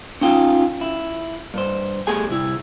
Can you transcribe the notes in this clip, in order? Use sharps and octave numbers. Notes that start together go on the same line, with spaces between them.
C#4 D#4 F4 G5
E4
G2 C5
A3 G4 G#4 G#5
C2 E4